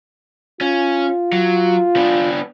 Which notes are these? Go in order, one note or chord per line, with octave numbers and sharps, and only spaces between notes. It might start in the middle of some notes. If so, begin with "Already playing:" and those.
C#4 F4
F#3
B3 D4